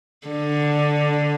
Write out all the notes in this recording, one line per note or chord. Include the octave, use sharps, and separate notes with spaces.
D3